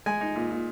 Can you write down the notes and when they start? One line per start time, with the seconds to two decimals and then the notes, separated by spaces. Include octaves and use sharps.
0.06 G#3 G#5
0.21 D#4
0.36 A#2
0.51 A#2